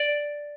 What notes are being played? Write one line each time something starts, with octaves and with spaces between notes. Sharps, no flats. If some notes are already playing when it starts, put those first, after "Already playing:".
Already playing: D5